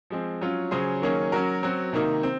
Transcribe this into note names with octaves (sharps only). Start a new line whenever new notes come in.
F3 G#3 C4
F#3 C#4 F4
C#3 F#3 C#4 G#4 C5
D#3 F#3 A#3 C#4 G#4
F#3 C#4 F#4 A#4
F#3 C4 F#4
C3 D#3 A#3 D#4
C4